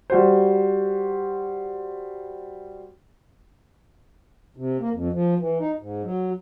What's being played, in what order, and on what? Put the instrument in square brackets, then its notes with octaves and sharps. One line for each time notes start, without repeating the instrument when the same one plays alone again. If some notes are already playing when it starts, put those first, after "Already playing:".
[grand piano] G3 F#4 C5
[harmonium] C3
A#3
F2
F3
E3
D#4
G#2
F#3